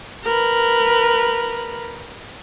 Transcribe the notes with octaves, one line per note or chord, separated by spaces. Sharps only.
A#4 B4